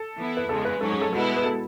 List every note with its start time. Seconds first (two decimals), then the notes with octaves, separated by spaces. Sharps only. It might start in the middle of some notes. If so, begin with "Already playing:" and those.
Already playing: A4
0.18 E3 B3 E4
0.37 B4
0.49 E2 C#3 G#3 A4
0.65 B4
0.80 G#2 F#3 C#4 A4
0.91 G#4
1.02 A4
1.13 B2 G#3 B3 E4 A4
1.36 B4
1.44 A4